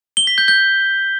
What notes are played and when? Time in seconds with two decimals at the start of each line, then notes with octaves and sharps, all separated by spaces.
0.17 G7
0.27 B6
0.38 G6
0.48 G6